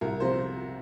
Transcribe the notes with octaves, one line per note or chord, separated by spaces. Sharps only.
C2 A#4
C3 F3 C5